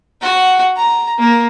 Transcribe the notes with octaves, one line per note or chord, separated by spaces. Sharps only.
F#4 F#5
A#5
A#3